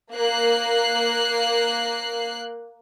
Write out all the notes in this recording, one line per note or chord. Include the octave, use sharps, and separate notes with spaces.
A#3 F#6 C7